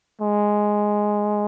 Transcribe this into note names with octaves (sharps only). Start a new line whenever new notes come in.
G#3